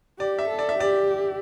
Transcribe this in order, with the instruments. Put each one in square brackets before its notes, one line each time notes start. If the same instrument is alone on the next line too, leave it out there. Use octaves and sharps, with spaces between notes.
[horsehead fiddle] G4 [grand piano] D5
[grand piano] E5
[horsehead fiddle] A4
[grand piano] D5
E5
[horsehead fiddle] G4 [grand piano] D5